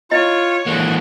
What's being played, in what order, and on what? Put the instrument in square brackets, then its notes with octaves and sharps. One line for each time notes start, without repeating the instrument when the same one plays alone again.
[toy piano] E4 D#5 [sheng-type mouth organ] F4 [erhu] C#5
[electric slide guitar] E3 G#3 A#3 [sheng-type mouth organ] F#5